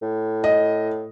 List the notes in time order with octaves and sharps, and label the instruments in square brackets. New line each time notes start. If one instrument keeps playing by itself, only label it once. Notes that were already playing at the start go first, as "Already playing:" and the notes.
[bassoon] A2
[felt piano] D#5